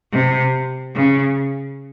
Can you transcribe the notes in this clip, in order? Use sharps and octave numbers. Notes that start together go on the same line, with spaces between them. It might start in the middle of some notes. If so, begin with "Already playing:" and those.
C3
C#3